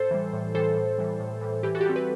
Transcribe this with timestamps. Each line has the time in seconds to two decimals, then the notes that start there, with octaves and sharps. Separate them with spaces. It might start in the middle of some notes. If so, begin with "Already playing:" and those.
Already playing: A2 A4 C5
0.11 E3 G3
0.33 A2
0.55 E3 G3 A4 C5
0.77 A2
0.98 E3 G3
1.20 A2
1.41 E3 G3
1.63 E3 G4 B4
1.75 F#4 A4
1.81 G4
1.85 G3 C4 F#4 A4
1.96 G4 B4